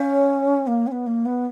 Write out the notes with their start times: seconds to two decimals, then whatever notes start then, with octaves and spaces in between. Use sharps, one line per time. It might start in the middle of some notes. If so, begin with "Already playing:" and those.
Already playing: C#4 C#5 F5
0.67 A#3
0.87 C#4
0.92 B3
1.06 A#3
1.25 B3